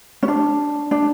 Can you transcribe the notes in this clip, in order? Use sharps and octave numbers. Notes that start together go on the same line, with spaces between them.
C#4
D4
D4